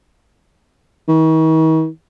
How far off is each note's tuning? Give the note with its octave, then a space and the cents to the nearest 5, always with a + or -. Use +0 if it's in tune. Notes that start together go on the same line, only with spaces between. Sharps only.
D#3 +45